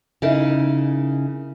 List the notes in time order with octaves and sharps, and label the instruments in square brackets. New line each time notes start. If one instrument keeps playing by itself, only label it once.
[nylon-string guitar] C#3 D#4 E4 A#4